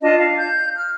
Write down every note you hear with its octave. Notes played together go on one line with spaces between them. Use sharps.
D4 F4 D#5 A5
F5
G6
F6